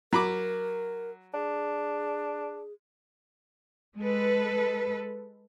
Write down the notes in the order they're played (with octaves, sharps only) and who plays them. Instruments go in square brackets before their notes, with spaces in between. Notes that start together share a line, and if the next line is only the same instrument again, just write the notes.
[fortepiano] F#3 B5 D6 [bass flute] A#4
[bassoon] D4 [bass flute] G#4
[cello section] G#3 A4 B4